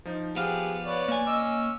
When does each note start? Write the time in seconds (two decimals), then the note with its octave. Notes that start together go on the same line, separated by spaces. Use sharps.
0.05 F3 D#4
0.36 F3 B3 G4 G#4 F5 F#5
0.85 B4 C#5 D5
1.08 A#3 G#5
1.27 C#4 D#5 D6 E6